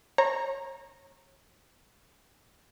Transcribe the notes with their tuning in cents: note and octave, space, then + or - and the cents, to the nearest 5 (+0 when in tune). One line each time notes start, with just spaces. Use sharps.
C#5 -20 A#5 +0